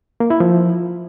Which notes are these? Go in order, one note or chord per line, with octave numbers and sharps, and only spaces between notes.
A#3
E4
F3